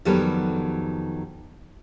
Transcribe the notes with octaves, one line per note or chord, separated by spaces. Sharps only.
F2 D#3 F#3 G3 B3 A4